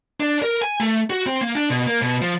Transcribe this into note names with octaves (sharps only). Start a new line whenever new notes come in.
D4
A#4
G#5
A3
F#4
C4
A#3
D4
B2
A#3
B2
F3